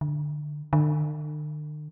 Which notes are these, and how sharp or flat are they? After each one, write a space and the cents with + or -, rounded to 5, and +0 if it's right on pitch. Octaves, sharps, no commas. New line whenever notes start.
D3 +15
D3 +45